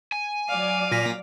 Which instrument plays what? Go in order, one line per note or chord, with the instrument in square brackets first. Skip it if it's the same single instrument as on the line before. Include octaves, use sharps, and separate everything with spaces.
[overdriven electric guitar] G#5
[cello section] F#3 D5 [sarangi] F5
[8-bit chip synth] A#2 A#6 B6